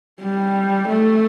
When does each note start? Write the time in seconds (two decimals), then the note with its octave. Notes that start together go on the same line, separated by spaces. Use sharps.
0.21 G3
0.88 A3